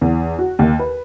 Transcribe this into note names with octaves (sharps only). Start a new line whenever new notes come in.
E2
F#4
D#2
B4